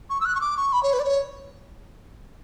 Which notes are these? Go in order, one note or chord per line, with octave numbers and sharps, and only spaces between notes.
C#6
E6
F#6
C#6
D6
C#6
B5
C#5
B4
D5
C#5